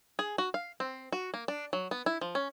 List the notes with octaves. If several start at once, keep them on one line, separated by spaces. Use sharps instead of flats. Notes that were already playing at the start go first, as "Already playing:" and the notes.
G#4
F#4
F5
C4
F#4
A#3
D4
F#3
B3
E4
F3
C#4